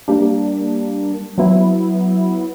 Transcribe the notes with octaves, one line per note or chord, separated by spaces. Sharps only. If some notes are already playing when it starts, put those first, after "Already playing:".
G3 A#3 D4
F#3 B3 E4